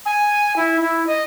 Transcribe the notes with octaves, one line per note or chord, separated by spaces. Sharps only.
G#5
E4
E4
D#5